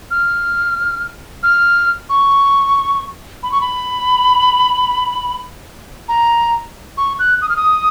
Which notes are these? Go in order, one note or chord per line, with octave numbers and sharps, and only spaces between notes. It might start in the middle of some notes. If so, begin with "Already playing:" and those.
F6
F6
C#6
B5
C#6
B5
A#5
C#6
F#6
D#6
F6
D#6